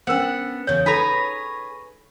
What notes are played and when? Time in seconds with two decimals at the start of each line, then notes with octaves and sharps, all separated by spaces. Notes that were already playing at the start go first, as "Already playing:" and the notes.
0.07 B3 C#4 D4 A#4 C5 F#5
0.67 E2 C#3 C#5
0.86 D#4 G#4 A4 B4 C#5 A#5 B5